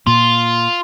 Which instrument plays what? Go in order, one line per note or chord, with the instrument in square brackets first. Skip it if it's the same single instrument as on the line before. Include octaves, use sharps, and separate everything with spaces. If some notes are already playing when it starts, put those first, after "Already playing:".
[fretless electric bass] A#2 A#3 [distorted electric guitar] F4 [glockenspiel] C6